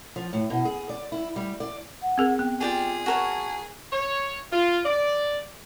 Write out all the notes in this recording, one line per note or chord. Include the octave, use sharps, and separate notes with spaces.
F3
A2
B2
G#4
D5
E4
G3
D5
F#5
C4 G#4 A#4
B3 G5
F4 G4 G#4 D5 G5
F#4 A#4 C#5 A5
C#5
F4
D5